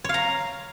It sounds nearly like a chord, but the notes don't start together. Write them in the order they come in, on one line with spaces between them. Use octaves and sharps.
C#5 F5 A#5